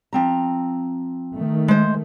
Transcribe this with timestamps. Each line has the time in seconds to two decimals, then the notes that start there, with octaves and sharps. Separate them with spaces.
0.13 F3 C4 A#5
1.37 D#3 A3
1.68 G#3 C5